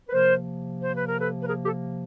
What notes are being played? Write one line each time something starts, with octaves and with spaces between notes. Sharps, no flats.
B4
C3 F3 A#3 A#4 C5
C5
B4
A#4
A4 B4
B4
G#4 A#4
G4 A4